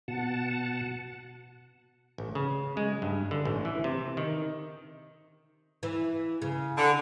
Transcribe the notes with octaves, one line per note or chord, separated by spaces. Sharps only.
B2 F#5 A5
A1
C#3
G#3
G2
D3
A1
E3
C3
D#3
E3
C#3
D3